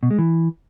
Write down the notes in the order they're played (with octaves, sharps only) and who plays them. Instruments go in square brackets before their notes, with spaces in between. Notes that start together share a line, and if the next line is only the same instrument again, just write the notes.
[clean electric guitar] B2
G#3
E3